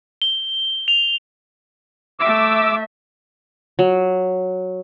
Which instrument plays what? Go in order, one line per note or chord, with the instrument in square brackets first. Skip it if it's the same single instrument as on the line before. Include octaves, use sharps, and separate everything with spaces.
[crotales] G7
F7
[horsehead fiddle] A3 E5 [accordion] D6 E6
[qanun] F#3